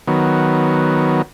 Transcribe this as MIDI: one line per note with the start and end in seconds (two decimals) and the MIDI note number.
0.08 1.22 51
0.08 1.22 54
0.08 1.22 59